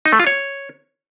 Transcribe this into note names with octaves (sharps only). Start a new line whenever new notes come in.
D#4
A3
F4
C#5